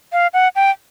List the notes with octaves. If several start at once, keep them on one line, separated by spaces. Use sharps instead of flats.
F5
F#5
G5